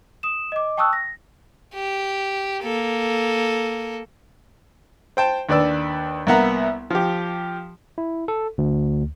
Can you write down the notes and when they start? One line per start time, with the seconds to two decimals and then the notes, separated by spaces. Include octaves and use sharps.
0.23 D#6 E7
0.52 D#5 D6
0.77 G5 A5 C#6 D#6 E6 F#6
0.93 A#6
1.74 G4
2.63 A#3 A4
5.17 C5 G5 A5
5.49 D#2 D4 B4 D5 E6
6.27 C2 A#3 B3 E5 F#5 A#5
6.90 F3 G4
7.98 E4
8.28 A4
8.58 D2